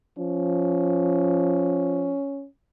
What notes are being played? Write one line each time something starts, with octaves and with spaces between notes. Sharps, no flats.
F3 C#4